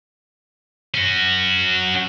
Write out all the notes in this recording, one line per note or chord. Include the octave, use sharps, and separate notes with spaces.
C#4 F#4